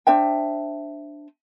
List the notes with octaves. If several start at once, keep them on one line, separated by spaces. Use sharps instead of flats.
D4 C5 E5 G5